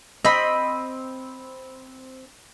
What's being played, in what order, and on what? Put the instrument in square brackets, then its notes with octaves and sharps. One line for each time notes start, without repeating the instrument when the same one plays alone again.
[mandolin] C4 B5 [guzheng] D#5